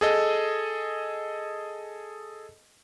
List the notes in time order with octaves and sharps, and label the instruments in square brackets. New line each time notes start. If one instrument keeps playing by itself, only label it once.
[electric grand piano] G#4 A4 D#5